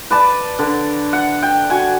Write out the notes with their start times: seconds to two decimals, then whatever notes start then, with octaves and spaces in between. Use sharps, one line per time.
0.10 B4 D5 A5
0.59 D3
1.13 F#5
1.42 G5
1.70 F#4 G#5